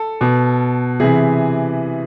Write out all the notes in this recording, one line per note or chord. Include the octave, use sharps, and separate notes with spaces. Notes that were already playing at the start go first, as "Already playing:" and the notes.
Already playing: A4
B2
C3 E3 G#4